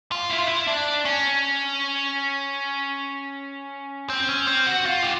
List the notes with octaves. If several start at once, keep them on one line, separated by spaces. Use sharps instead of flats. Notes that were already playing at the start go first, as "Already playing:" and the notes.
F4
E4
F4
E4
D4
C#4
C4
C#4
C4
F#4
F4
G4